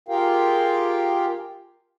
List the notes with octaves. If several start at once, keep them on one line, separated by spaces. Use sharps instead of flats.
F4 G4 G#4 A#4 F5 G5